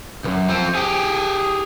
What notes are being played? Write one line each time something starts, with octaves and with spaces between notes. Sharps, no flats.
C#2 F#2
F3 C4
G4 G#4